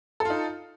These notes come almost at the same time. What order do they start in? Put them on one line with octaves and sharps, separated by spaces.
A4 F4 D#4